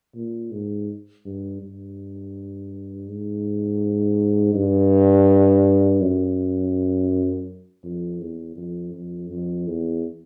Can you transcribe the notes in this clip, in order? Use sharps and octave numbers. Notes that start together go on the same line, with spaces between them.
A#2
G#2
G2
G2
G#2
G2
F#2
F2
E2
F2
F2
F2
E2